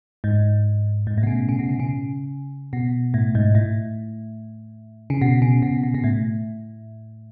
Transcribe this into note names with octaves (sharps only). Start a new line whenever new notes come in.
G#2
G#2
A2
B2
C#3
C#3
B2
C#3
C#3
B2
A2
G#2
A2
C#3
B2
C#3
B2
B2
B2
A2